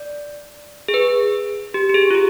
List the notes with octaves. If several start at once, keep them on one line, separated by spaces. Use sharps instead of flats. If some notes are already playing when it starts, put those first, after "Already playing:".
Already playing: D5
G#4
B4
G4
G4
G#4
F4
G4